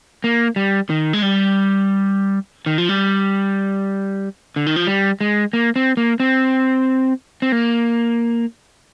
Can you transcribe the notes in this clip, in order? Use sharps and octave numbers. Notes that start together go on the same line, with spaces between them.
A#3
G3
D#3
G#3
G3
D#3
F3
G3
D3
D#3
F3
G3
G#3
A#3
C4
A#3
C4
C4
A#3